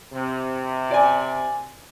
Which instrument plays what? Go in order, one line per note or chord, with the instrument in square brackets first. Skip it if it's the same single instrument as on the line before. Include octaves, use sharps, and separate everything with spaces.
[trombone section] C3
[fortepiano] D5 G#5